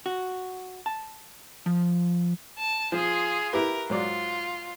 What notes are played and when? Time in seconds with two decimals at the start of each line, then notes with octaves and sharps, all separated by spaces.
0.06 F#4
0.86 A5
1.66 F3
2.58 A5
2.92 F3 F4 G#4
3.53 E4 G4 A#4 B4
3.90 G#2 F#3 F4 D5